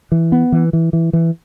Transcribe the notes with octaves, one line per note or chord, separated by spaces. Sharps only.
E3
B3
E3
E3
E3
E3